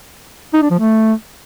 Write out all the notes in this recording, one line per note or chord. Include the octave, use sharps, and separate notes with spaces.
D#4
D4
F3
A3